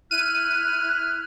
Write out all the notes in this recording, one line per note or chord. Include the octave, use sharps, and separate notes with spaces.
E4 F6 F#6 D#7